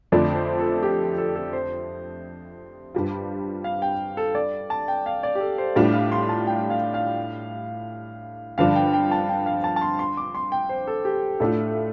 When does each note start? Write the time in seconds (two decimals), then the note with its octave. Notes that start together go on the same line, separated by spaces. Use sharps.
0.12 F2 D3 F3 A3 D4 D5
0.36 C5
0.60 A4
0.83 G4
1.18 A4
1.35 A4
1.53 C5
2.95 G2 G3 F4
3.64 F5
3.82 G5
4.17 A4
4.35 D5
4.70 A5
4.88 G5
5.06 F5
5.23 D5
5.35 G4
5.40 A4
5.58 C5
5.76 A2 G3 D4 F4 D5
5.94 F5
6.12 C6
6.29 A5
6.47 G5
6.70 F5
6.94 F5
8.58 G2 D3 F3 D4 F5
8.75 G5
8.93 G5
9.11 A5
9.29 G5
9.46 F5
9.64 A5
9.76 A5
9.81 C6
9.99 C6
10.17 D6
10.35 C6
10.52 G5
10.69 C5
10.87 A4
11.05 G4
11.40 A2 A3 D4 F4 A4